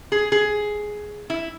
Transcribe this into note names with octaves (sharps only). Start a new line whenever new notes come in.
G#4
G#4
E4